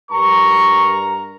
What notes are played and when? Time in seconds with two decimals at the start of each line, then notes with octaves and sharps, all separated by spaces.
0.11 G2 A#4 A#5 C#6